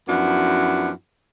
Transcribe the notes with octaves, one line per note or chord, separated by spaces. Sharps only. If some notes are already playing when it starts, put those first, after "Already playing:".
F#2 F3 B3 D4 E4 F#4